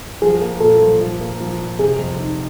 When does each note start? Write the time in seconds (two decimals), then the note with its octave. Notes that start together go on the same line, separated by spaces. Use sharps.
0.22 F3 G#4
0.41 A#3
0.60 A#2 A4
0.81 F3
1.01 F3
1.21 A#3
1.40 F3
1.60 A#2
1.79 C3 G#4
1.99 F2
2.19 D#3